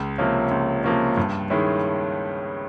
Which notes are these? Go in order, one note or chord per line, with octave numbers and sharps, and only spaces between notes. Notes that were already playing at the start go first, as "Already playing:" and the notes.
Already playing: C#2
C3 F3 A#3 C#4
C#2
C3 F3 A#3 C#4
G2
D#3 G#3 C#4 E4